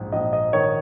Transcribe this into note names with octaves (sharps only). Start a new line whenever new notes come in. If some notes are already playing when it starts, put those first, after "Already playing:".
Already playing: A#1 G#2
A#1 D#5
D#5
D#3 C#5